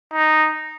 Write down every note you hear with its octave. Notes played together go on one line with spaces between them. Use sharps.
D#4